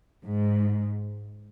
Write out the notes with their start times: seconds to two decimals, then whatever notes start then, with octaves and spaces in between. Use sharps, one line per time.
0.25 G#2